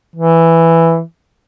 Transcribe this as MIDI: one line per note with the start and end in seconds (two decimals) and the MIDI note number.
0.16 1.01 52